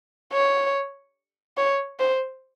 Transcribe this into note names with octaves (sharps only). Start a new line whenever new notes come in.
C#5
C#5
C5